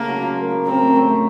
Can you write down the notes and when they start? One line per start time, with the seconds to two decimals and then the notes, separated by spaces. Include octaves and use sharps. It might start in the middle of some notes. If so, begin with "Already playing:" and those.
Already playing: C#3 A3 A#3
0.08 F#3
0.22 F4
0.37 A#3
0.51 A2
0.66 C4 A#4
0.80 A3
0.95 A3
1.09 A3